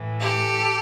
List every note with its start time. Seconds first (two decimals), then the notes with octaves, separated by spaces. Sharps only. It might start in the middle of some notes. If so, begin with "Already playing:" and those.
Already playing: A2 E3
0.20 G4 A4